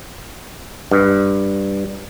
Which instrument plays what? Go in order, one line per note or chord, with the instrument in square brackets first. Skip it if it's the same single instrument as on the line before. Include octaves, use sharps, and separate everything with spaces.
[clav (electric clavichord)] G2